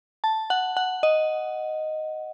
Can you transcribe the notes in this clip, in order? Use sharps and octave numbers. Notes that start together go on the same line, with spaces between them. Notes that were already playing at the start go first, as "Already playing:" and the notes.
A5
F#5
F#5
D#5